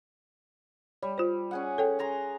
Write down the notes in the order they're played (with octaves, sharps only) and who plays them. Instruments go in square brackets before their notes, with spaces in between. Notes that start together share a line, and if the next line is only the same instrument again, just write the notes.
[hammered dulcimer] G3 [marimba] C#5
[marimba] F4 C5
[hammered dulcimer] C#4 G#4 F#5
[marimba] A4 C#5 G5
[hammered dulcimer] G#5 A#5 C6